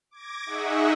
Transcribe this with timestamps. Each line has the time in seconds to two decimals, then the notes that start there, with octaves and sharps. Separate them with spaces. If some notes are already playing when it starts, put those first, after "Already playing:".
0.11 D6 G#6 A#6
0.46 D#4 G#4 D#5 E5 F#5 C#6